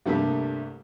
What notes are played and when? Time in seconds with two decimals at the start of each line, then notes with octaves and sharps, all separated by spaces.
0.06 C2 G2 G3 A3 A#3